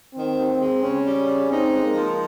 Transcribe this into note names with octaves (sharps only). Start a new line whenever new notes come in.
D#3 C4
D#2
G#3
C#3 C#4
G3
C#3
C4 D#4
G#3
A#3
F3